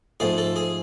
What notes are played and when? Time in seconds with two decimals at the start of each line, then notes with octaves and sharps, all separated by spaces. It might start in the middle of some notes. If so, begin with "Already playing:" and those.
0.20 G#2 F3 A3 G#4
0.38 A4
0.56 G#4